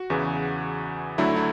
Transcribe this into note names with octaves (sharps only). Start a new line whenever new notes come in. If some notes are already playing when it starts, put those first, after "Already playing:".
Already playing: F#4
E2 C#3 E3
D2 D3 F#3 A3 E4
E4